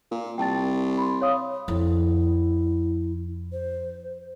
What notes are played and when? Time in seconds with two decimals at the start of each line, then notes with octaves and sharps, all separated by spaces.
0.11 A#2
0.38 C2 G5 A5 A6
0.98 B5 C6
1.21 C#5 F5 D#6
1.68 F2 E4
3.53 C5